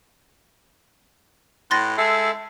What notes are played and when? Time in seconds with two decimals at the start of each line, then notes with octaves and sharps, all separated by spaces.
1.71 A2 C6 F#6 A6 A#6
1.98 G#3 A4 E5 C7